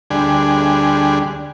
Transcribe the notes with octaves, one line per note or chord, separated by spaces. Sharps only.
D2 G3 D4 G#4